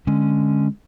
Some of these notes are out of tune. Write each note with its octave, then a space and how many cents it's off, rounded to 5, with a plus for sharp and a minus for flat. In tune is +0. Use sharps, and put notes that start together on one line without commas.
D3 +0 G#3 +0 C#4 +0